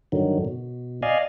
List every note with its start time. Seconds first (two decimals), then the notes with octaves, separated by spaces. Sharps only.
0.12 G2 D3 D#3 F#3
0.45 B2
1.03 D5 D#5 F5 G#5